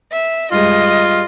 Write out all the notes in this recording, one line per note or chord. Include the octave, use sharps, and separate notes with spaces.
E5
G2 G3 G#3 F4 D#5